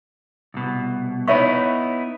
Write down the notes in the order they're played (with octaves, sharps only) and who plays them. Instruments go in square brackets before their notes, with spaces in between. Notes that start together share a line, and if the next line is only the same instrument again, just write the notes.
[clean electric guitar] C2 B2
[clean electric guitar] B3 D#4 E4 [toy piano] C#5 E5 C#6